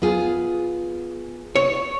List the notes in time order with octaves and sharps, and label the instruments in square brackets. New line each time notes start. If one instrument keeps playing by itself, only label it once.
[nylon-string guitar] B3 F4 G#4
[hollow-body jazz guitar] C#5